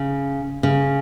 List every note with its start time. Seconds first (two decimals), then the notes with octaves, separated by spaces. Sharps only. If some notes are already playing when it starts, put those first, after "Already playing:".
Already playing: C#3
0.63 C#3